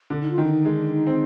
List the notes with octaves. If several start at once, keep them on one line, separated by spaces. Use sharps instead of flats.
D3
D#4
F4
D#3
D4
D#4
G#3
D4
D#4
C4